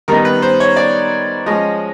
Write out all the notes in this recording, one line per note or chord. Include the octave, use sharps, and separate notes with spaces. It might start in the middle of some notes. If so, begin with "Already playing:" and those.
D#3 G3 B3 D#4 A#4
B4
C5
C#5
D5
F3 G#3 C#4 D#5